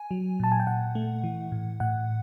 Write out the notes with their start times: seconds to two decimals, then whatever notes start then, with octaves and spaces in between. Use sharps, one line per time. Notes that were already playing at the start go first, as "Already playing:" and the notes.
Already playing: G#5
0.11 F#3
0.40 A#2 A5
0.52 G#5
0.60 G5
0.67 A#2 F#5
0.95 A3
1.24 E3
1.52 A2
1.80 A2 F#5